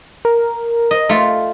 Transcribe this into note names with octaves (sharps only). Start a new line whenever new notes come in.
A#4
D#5
A3 F4